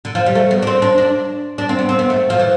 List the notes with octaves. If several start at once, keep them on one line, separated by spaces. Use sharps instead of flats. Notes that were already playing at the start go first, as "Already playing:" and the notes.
D3
F3
G3
A3
B3
D4
C4
D4
D4
D4
C4
B3
C4
B3
A3
F3
E3